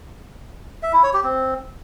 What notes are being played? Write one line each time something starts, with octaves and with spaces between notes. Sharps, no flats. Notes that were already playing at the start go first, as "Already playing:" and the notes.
E5
E4
C#5
G4
C4